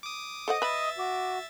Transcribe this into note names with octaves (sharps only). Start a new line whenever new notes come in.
D6 D#6
A4 C5 D#5 F#5
B4 E5 B5 A6
F#4 D6